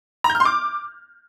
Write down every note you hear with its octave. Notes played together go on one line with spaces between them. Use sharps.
A#5
G6
F6
C6
D6